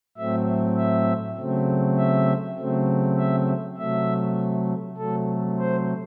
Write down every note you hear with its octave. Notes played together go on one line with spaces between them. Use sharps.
A2 F#3 A3 C4 E5
E5
C#3 F#3 A3 C4
E5
C#3 F#3 A3 C4
E5
C3 F#3 A3 E5
C3 F#3 A3 A4
C5